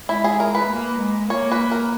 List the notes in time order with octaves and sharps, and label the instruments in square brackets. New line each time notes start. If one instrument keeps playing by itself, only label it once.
[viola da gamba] G#3 [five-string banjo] E4
[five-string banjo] G#4
A#4
B4
[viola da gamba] A#3
G#3
[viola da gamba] A#3 [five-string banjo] C#5
[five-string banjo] B4
A#4